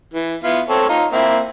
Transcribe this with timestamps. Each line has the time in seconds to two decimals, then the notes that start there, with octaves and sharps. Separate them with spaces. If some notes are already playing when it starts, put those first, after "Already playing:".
0.14 E3
0.44 B3 E4 F4
0.69 C4 A4 C#5
0.89 D#4 F4 A#5
1.12 A#3 C4 E4